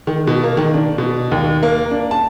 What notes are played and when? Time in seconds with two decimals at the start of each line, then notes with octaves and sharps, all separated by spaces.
0.07 D#3
0.27 B2
0.44 A#3
0.57 D#3
0.74 D4
0.98 B2
1.32 D#2
1.63 A#3
1.91 D4
2.11 A5